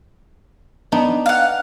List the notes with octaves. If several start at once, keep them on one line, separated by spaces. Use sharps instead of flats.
B3 D4 D#4
F5 F#5